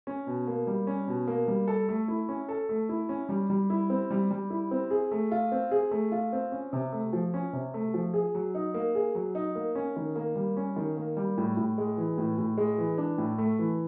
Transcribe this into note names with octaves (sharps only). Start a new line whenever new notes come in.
C#4
B2
A#3
G3
C#4
B2
A#3
G3
A4
A3
E4
C#4
A4
A3
E4
C#4
G3
G3
E4
C4
G3
G3
E4
C4
G#4
A3
F4
C4
G#4
A3
F4
C4
C#4
C3
A3
F3
C#4
C3
A3
F3
G#4
F#3
D#4
A#3
G#4
F#3
D#4
A#3
C#4
D#3
A#3
G3
C#4
D#3
A#3
G3
A2
A2
G#3
E3
A2
A2
G#3
E3
D4
A2
A3
E3